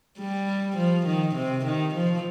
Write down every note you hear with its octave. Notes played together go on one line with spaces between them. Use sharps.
G3
F3
D#3
C3
D#3
F3